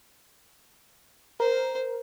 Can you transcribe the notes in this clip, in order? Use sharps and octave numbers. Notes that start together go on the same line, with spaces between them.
A#4 C5